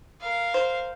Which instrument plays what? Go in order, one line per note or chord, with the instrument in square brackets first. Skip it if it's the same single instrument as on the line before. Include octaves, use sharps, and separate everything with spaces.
[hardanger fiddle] A#4 F5
[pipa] C5